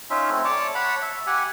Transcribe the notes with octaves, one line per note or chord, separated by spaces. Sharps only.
C#4 D#4 F4 E5
A3 C4
C#5 D5 A5 D6
C#5 F#5 A5 B5
E5
G4 F#5 G#5